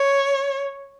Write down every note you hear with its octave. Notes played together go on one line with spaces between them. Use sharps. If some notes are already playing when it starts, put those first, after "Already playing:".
Already playing: C#5